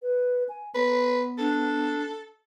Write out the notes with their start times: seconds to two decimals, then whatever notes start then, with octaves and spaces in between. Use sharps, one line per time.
0.02 B4
0.49 G#5
0.75 B3 B4
1.38 D4 A4